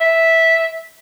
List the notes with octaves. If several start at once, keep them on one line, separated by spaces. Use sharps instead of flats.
E5